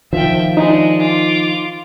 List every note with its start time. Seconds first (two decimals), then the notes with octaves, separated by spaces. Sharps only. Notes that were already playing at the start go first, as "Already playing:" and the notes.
0.13 D#3 F3 E5 G5
0.57 G#3 D4 D#4
0.98 F4 D6